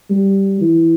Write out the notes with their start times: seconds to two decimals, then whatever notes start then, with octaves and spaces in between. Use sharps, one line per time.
0.10 G3
0.61 E3